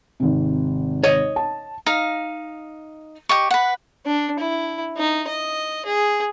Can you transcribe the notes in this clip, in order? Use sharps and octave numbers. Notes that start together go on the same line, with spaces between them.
G#1 C3
C#5 D#5
A5
D#4 F5
G4 D#5 C#6
B4 F#5
D4
E4
D#4
D#5
G#4